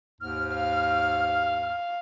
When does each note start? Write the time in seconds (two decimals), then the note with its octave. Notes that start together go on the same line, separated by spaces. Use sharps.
0.21 D#2 G#2 F6
0.55 F5